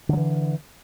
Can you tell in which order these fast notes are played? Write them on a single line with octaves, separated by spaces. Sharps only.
D3 F#3 E3